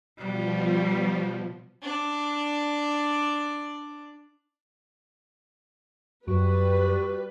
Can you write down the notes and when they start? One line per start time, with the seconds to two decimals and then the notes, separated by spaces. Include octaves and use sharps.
0.18 B2 F3 G3
1.82 D4 D5
6.28 F#2 G3 F#4 B4